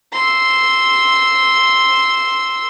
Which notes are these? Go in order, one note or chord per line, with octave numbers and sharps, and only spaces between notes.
C6 E6